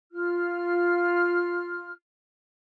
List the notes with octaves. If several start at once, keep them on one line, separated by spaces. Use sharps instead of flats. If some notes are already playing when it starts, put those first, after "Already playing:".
F4 F6